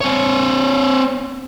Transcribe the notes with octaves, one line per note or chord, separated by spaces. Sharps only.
C4 C#5